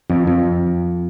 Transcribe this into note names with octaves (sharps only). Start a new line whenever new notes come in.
F2
F2